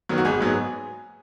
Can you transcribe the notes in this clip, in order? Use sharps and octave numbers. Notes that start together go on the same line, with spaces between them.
D#3 F#3 B3
F#4
G#1 G#4
G#2 F#3 B3